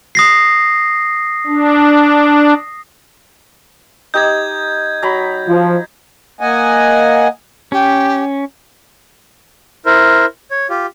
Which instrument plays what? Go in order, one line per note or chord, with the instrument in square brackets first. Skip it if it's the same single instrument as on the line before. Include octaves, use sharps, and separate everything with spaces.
[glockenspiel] D#6 A#6 C7
[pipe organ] D4
[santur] D#4 G4 D#5 [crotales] G6 G#6
[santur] F#3 A#5 B5
[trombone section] F3
[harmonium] A#3 D#5 F#5 G#5
[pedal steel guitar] C#4 [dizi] G4
[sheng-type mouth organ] E4 A#4 C5
C#5
F4 G4